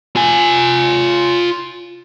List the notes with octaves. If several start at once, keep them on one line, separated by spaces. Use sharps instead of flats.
F4 G#5